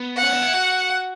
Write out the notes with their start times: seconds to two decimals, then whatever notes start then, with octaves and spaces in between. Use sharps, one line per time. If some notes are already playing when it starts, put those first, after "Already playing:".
Already playing: B3
0.17 F#5
0.22 C#4
0.33 D4
0.42 E4
0.53 F#4